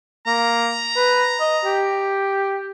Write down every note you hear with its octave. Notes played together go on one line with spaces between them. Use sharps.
A#3 A#5
B4
D#5
G4